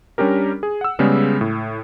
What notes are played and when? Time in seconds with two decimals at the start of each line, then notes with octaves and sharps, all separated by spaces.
0.18 G3 C#4 D4 G4 A#4
0.63 G#4
0.81 F#5 E6
0.99 C#3 G3 G#3 B3
1.41 A2